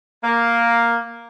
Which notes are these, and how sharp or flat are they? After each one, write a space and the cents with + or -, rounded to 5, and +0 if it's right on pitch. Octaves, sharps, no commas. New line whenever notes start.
A#3 +0